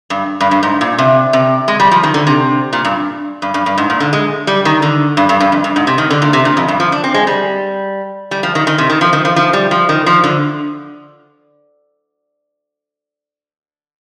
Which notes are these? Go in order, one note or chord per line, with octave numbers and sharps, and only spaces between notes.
G2
G2
G2
G#2
A#2
C3
C3
G#3
G3
F3
D#3
D3
C3
A#2
G2
G2
G2
G2
G#2
A#2
D3
G#3
G3
D#3
D3
G2
G2
G2
F2
G2
G#2
C3
D#3
D3
A#2
C3
A#2
F2
G2
F3
D4
C4
G#3
G3
G3
F3
D#3
D#3
C3
D#3
F3
D#3
F3
F3
G3
F3
D#3
F3
D3